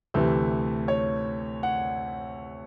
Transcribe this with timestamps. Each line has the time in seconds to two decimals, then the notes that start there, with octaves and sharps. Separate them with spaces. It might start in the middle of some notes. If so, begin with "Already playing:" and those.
0.14 D2 C3 E3 A3
0.88 C#5
1.63 F#5